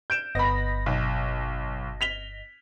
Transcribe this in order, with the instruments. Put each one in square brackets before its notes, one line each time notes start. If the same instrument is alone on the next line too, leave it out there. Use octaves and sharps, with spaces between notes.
[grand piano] G6 D7 E7
[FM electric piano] G1 D#5 A#6 [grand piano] B3 B5
[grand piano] B1
B6 F7 G7